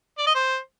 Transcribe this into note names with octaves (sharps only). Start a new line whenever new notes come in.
D5
D#5
C5